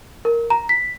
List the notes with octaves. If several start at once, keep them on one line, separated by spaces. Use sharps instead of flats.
A#4
A#5
B6